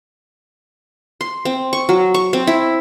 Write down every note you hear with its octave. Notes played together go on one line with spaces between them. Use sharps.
C6
C4
C#6
F#3
C#6
C4
E4